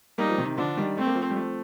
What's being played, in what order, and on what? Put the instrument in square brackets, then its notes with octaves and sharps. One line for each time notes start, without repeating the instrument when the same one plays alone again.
[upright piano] G3 A#3 [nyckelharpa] D#4
[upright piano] F3
C3 D#3
[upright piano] D3 F3 [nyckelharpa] D4
[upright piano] D#3 G3
[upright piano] A3 [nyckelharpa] C4
[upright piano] A#3
F3 A3
G3
F3 A3